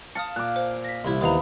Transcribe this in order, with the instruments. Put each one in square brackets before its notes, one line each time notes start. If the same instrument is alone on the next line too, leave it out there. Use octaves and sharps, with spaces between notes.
[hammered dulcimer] F5 A5 [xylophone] D#6 C#7
[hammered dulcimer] A#2 D6 [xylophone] F#6
[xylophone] C5
A#6 B6
[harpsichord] C2 E4
[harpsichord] D#2 E3 [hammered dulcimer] B3 [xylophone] C5 F5 A#5